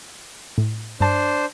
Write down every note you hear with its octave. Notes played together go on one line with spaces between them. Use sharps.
A2
G2 D4 C5 A5